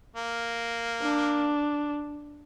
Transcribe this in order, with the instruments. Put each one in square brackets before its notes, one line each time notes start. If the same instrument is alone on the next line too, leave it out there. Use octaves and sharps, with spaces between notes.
[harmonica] A#3
[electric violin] D4